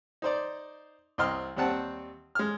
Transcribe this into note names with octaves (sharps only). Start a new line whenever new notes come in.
D#4 C5 D5
C2 C4 D#5 C6 F6
D#2 G3 C4 F#5 A5
G#3 F6